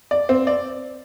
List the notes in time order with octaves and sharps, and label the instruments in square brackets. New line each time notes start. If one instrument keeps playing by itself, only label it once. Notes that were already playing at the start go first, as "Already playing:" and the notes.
[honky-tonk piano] D5
C4
D5